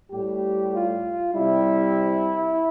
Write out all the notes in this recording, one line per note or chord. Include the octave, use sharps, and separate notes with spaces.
A2 G3 G4
F4
C3 G3 E4